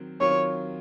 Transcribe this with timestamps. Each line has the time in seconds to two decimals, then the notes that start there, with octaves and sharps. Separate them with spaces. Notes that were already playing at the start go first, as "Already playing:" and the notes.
Already playing: D#3 F#3 C4
0.20 D#3 F#3 C4 F4 C#5